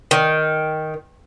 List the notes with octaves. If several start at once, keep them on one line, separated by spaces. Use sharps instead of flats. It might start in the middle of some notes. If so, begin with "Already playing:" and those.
D#3